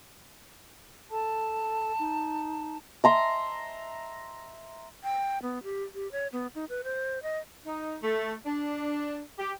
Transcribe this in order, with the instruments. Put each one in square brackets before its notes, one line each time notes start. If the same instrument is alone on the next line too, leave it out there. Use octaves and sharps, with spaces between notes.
[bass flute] A4 [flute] A5
[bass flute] D#4
[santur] E5 A#5 C6
[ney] G5
B3
G4
G4
C#5
B3
D#4
B4
C5
D#5
[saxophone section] D#4
A3
D4
G4